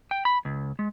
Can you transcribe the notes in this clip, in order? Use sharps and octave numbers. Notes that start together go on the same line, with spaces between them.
G5
B5
C#2
G#3